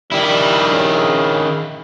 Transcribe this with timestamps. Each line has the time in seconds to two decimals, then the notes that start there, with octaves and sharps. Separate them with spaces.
0.12 D#3 G3 E4
0.71 C#3